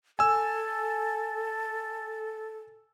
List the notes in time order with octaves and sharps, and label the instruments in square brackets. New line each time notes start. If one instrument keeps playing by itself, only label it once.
[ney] A4 [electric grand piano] G#5 E6